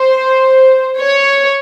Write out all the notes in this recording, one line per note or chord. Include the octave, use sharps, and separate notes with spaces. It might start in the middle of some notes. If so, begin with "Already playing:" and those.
Already playing: C5
C#5